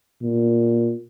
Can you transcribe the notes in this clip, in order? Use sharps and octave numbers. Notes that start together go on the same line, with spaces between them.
A#2